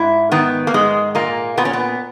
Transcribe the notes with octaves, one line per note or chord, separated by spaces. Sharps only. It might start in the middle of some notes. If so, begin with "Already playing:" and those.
Already playing: G#2 E4
D#3 B3
A#3
G#2 G#3
A#2 A#3
A#2 B3
C#4
B3